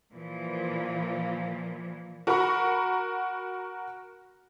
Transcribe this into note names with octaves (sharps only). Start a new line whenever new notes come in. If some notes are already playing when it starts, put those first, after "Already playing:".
A#2 E3 F3
F#4 A#4 F#5 A#5 B5 C#6